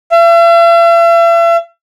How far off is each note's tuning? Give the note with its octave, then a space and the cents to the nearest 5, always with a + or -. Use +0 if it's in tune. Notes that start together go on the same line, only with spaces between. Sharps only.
E5 +45